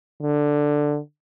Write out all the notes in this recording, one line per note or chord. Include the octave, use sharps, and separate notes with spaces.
D3